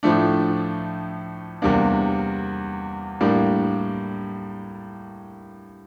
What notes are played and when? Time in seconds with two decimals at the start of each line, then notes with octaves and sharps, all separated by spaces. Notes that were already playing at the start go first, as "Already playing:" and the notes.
0.03 A2 F3 A3 D4
1.62 E2 C3 G3 A#3 D4
3.21 A2 G3 A#3 D4